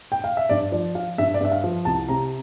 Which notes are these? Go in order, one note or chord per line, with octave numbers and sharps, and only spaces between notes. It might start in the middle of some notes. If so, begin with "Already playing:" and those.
G5
F5
E5
G2 D5
F3 D5
F3 F5
G2 E5
D5
G2 E5
F5
F3
C2 A5
C3 A#5